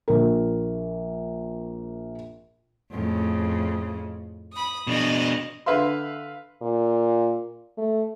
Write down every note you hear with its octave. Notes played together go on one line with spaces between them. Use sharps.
A#1 A#4
F2 A2 C#3
B5 D#6
B2 D4 D#5
D3 B4 E5 F5 C6
A#2
A3